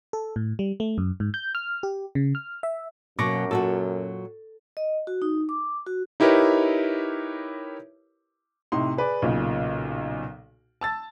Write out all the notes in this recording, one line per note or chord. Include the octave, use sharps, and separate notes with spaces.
A4
A2
G3
A3
F#2
G#2
G6
F6
G4
C#3
F6
E5
F#2 B2 F#3 A#3 C#6 D6 A#6
A#2 F#3 F#4 A4
D#5
F#4
D#4
D6
F#4
D#4 E4 G4 A#4 B4 C#5
A2 C3 D#4 C6
G#4 B4 D5
B1 A#2 C#3
A5 E6 A6